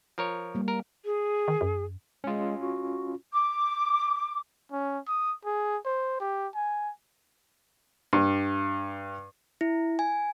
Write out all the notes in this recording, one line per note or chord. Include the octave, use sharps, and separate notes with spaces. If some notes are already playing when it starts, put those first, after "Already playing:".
F3 A#4 C#5
G3 A#3
A#4
G#4
D#3
F#2
G#3 C#4 F4
F#4
D6
C#4
D#6
G#4
C5
G4
G#5
G2
E4
G#5